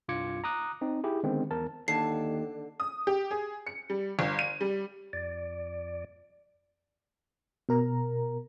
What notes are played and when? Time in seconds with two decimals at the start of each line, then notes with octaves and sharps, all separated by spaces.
0.08 C2 G2 F4 D6 G#6 C#7
0.44 A#5 D6 D#6 F#6
0.81 C4 D#4
1.04 E4 G4 G#4
1.24 D3 D#3 G#3 B3 C4
1.51 E2 A#4 A5
1.88 D#2 D3 A5 C7
2.80 D#6
3.07 G4
3.31 G#4
3.67 C#7
3.90 G3
4.19 G1
4.39 D#7
4.61 G3
5.13 F2 D5
7.69 B2 A#4 A#5